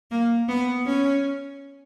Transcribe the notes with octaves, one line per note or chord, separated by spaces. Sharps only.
A#3
B3
C#4